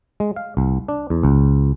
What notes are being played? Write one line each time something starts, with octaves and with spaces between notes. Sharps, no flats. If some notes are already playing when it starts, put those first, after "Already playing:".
G#3
F5
C2
D4
E2
C#2